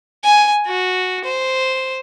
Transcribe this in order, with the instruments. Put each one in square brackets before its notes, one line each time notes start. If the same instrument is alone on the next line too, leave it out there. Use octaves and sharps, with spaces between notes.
[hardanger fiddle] G#5
F#4
C5